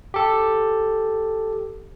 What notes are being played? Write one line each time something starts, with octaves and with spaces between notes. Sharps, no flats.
G4 A4